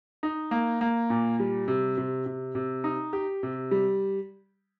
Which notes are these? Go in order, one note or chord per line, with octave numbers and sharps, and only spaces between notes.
D#4
A#3
A#3
A#2
G3
C3
C3
C3
C3
D#4
G4
C3
G3